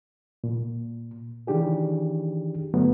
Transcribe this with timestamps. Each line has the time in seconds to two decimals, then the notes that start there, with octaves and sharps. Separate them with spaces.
0.44 A#2
1.47 D#3 E3 D4 G4 G#4
2.74 G2 D3 F#3 A3 B3